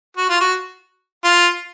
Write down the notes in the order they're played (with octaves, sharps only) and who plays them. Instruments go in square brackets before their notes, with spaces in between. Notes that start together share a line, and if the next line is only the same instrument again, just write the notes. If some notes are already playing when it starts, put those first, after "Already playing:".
[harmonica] F#4
F4
F#4
F4